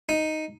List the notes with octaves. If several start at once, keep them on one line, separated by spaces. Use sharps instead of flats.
D#4